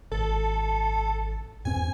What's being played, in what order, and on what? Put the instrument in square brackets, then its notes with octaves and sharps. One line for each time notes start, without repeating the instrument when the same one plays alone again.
[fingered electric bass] G#1 [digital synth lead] A4
[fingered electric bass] E2 G2 C4 [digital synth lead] G#5